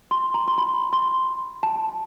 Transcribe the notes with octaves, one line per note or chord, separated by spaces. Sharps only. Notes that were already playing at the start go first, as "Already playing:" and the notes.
C6
A#5
C6
B5
C6
A5